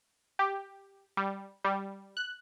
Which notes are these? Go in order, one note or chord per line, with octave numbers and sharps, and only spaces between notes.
G4
G3
G3
F#6